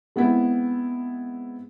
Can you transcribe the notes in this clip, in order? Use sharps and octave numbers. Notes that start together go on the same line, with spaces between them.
G#3 B3 C4 E4